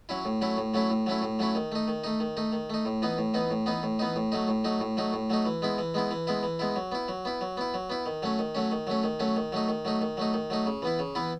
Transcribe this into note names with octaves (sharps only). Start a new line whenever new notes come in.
F#3 C#4 E4
A2
F#3 A3 C#4 E4
A2
F#3 A3 C#4 E4
A2
F#3 A3 C#4 E4
A2
F#3 A3 C#4 E4
D#3
A3 D#4
D#3
A3 D#4
D#3
A3 D#4
D#3
A3 D#4
A2
E3 B3 D#4
A2
E3 B3 D#4
A2
E3 B3 D#4
A2
E3 B3 D#4
A2
F#3 A3 D#4
A2
F#3 A3 D#4
A2
F#3 A3 D#4
A2
F#3 A3 D#4
E3
G#3 B3 E4
E3
G#3 B3 E4
E3
G#3 B3 E4
E3
G#3 B3 E4
F#3
B3 E4
F#3
B3 E4
F#3
B3 E4
F#3
B3 E4
D#3
F#3 A3 C#4
D#3
F#3 A3 C#4
D#3
F#3 A3 C#4
D#3
F#3 A3 C#4
D#3
F#3 A3 D#4
D#3
F#3 A3 D#4
D#3
F#3 A3 D#4
D#3
F#3 A3 D#4
C#3
E3 B3 E4
C#3
E3 B3 E4